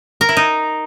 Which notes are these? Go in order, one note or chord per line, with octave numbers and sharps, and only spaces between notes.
A#4
E4
D#4